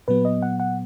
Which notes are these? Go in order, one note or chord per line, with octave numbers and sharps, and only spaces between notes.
A#2 F#3 B3 B4
D#5
F#5
F#5